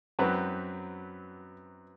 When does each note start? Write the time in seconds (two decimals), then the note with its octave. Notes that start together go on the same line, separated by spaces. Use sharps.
0.19 F#2 F#3 C4 B4